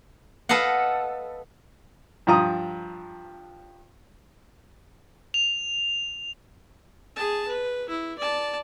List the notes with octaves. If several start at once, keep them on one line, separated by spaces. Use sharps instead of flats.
A4 B4 D#5 F5 F#5
G2 F3 A#5 D#6
F7
G#4 A5
B4
E4
D5 A5